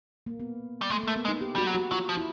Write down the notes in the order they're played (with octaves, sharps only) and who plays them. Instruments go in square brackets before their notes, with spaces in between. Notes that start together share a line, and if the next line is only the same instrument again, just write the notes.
[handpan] A#3
B3
[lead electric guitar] G3
[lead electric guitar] G#3 [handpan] A3
[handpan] A#3
[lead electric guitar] A3
[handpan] B3
[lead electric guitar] G#3
[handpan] D#4
G4
[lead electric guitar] G3 [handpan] F#4
[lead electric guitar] F#3
[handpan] F#4
[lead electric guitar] F#3 [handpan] F4
[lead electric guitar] F3
[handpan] E4